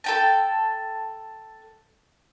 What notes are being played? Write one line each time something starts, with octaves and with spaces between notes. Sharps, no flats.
A4 G5 A5